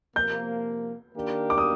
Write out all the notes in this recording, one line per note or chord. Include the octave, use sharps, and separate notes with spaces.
C3 F3 A#3 G6
D#3 A#3 D4 G4 A#4
D6
D#6